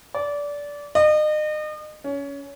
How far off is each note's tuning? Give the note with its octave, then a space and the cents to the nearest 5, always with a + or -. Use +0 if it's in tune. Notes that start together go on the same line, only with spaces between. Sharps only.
D5 -20
D#5 -35
C#4 +20